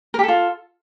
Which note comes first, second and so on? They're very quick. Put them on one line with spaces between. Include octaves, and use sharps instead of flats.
A#4 G4 A4 F4